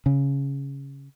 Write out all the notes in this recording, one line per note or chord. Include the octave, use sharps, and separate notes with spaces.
C#3